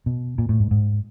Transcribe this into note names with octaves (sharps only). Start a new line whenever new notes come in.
B2
A#2
A2
G#2
G#2